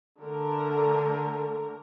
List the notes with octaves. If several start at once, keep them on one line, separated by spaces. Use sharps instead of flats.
D3 A3 A#4